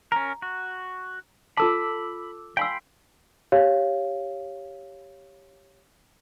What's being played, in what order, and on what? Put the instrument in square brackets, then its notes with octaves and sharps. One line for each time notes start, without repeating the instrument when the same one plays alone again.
[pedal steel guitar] C#4 A#4 [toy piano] A#5
[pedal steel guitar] F#4
[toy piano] F4 A4 A5 [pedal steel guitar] B5 [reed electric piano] D6 E6
[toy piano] F5 G#5 E6 [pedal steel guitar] G5 B5 C6
[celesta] G4 C#5 F5